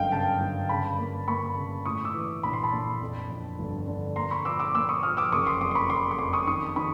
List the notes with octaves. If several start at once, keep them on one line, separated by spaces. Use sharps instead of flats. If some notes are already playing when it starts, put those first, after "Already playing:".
Already playing: G1 F#2 D#5 F5 G5
C#3 G5 A5
G1
C#3 A5 B5
A#3
A#3 B5 C#6
C#3
A2 C#6 D#6
D6 E6
E3
A#1 B5
C6
A5 B5
A#1
F2
F2
G1
D3
A#3 A#5 C6
B5 C#6
F3 D6 E6
D6 E6
A#3 D6 E6
C#6 D#6
F3 D#6 F6
D6 E6
F#1 C#6 D#6
C6 D6
F2 C6 D6
C6
B5 C#6
F2 C6 D6
C#6
F2 C6 D6
C#6 D#6
D#3 C#6 D#6
D#3 B5 C#6